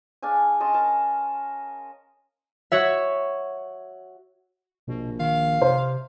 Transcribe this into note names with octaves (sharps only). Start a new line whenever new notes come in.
D4 G#4 F5 G#5
C#4 D#5 A5 C6
A#4 A5 A#5
F#4 C#5 E5
A#1 B2
D#3 F5
C3 C5